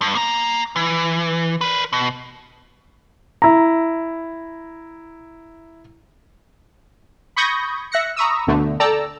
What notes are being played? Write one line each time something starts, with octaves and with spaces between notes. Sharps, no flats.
G2
A#3 A#5
E3
A#4 B4
B2
E4 A#5
B5 C#6 D#6 G6 G#6 A#6
E5 F#6 A#6 C#7
A#5 B5 C#6 D#6 E6
D2 B2 D3 A3
A4 D5 G5 A5 A#5 E6